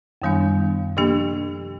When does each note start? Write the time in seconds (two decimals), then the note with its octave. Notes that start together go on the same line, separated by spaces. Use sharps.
0.22 F#2 D#3 G3 B3 D4
0.97 C3 F3 A#3 D4 G4